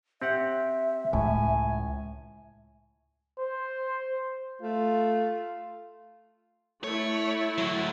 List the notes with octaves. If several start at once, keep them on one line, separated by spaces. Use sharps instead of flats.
C4 G4 E5 F#5
C#2 A2 G#5
C5
A3 F4
A3 E4 C#5
D2 F#3